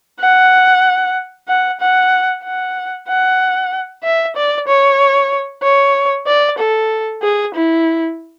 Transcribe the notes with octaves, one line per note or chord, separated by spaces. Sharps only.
F#5
F#5
F#5
F#5
F#5
E5
D5
C#5
C#5
D5
A4
G#4
E4